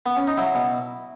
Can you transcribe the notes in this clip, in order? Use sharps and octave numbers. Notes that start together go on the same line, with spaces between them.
B3
C#4
D#4
F#3 E4
B2